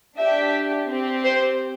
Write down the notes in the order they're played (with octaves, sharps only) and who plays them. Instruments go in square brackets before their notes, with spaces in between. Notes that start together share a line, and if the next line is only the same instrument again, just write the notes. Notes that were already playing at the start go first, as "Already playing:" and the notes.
[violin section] D4 G4 E5
C4 G4
C5